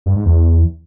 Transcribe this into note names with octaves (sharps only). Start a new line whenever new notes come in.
G2
G#2
E2